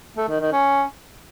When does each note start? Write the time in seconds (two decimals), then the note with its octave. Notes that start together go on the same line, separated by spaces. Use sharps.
0.17 A3
0.29 D#3
0.41 D#3
0.52 C#4